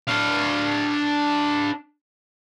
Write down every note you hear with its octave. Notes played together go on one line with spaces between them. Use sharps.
D4 F5